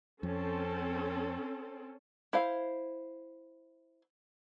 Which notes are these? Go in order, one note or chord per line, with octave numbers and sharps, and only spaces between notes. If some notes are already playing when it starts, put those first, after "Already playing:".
F2 C4 C#4 A4
E4 C5 F5